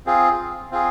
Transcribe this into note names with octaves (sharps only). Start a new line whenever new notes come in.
C4 F4 G#4
C4 F4 G#4